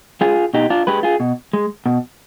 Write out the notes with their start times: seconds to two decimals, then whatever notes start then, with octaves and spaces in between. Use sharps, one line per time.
0.21 G#3 F4 G#4
0.54 B2 D#4 G4
0.70 D4 F4
0.87 G#3 G4 B4
1.03 F4 G#4
1.20 B2
1.53 G#3
1.86 B2